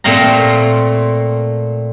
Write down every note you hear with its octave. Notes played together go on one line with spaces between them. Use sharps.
A#2 A3 C4 F5 A#5